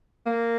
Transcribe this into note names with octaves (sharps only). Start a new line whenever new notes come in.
A#3